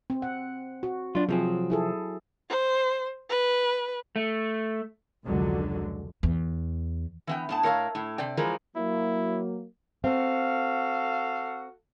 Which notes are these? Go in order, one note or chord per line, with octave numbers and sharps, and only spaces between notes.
C4
F#5
F#4
F#3 D4 F4
C3 F3 F#3 C4 G#4
E4 G#4 A4
C5
B4
A3
F1 C#2 D3 F#3 G#3
E2
E3 B3 G5
A2 B3 A5
A2 A#4 C#5 F5
A2
C3 D5 G5
E3 F3 G#3 A#4
F#3 A#3 E4
C4 F#4 A4 F5